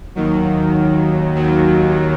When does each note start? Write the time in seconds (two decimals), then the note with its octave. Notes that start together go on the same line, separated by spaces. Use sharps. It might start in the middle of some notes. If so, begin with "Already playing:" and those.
0.15 D#2 D#3 F#3
1.35 D#2 D#3 F#3